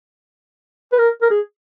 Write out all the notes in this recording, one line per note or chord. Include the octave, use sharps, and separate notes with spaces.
B4
A#4
A#4
G#4